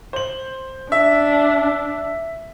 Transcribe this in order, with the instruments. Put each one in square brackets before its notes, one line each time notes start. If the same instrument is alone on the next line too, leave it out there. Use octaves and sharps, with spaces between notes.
[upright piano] C5 F#7
[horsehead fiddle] D4 [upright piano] E5